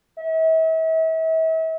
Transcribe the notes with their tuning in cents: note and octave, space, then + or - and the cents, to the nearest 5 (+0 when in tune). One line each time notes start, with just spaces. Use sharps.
E5 -40